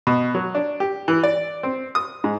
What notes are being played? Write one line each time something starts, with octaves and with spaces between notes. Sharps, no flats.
B2
F#3
D4
G4
E3
D5
C4
D#6
G#2